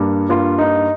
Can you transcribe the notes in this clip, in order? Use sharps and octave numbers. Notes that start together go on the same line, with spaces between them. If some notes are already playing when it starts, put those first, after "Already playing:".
Already playing: G2 G3 A#3
G2 G3 A#3 F4
D#4